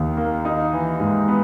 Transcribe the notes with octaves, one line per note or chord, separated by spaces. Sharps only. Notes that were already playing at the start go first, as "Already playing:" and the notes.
Already playing: D#2 D#3 D#4
A#3
D#4
E3
G#2
B3